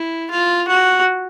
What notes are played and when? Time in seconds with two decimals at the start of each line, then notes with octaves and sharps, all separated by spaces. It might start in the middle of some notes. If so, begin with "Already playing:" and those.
Already playing: E4
0.31 F4
0.68 F#4